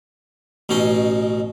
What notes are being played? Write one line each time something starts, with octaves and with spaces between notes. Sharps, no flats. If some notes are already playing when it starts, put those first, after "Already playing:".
A1 B2 C#4 D#4 D#5